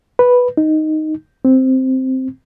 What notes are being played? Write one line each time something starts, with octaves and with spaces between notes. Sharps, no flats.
B4
D#4
C4